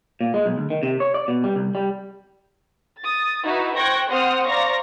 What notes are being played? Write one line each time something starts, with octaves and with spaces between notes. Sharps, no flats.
A#2
G#3
B1
D2
D#3
C3
C#5
D5
B2
G3
C2
G3
D#6 A6
D#4 E4 F#4 B4
C5 G5 C#6 F#6 G#6 A#6
C4 C5 F#5 C6 D#6 F6
C5 D5 F5 A#5 C#6 A#6